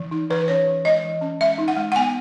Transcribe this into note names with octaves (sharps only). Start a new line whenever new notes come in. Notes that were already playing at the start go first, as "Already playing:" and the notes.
Already playing: E3
D#4
E3 B4
C#4 C#5
E3
G#3 D#5
E3
C#4
G#3 E5
D#4
F#5
G#3
F#5
B3 G#5